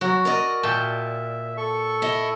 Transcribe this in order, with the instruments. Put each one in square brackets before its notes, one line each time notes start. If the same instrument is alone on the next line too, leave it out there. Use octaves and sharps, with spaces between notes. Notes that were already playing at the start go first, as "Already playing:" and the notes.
[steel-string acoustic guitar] F#3 [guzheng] F#4
[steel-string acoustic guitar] A#4 D5 D#5
[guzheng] A#2 G5 A5 [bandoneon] E5
[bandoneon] A4 C#6
[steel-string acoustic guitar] E4 D#5